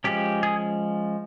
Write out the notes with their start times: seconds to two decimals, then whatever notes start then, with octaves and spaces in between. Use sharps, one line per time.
0.04 F3 G#3 C#4 G4
0.43 G#4